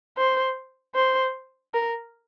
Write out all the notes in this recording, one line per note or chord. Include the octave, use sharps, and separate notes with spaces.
C5
C5
A#4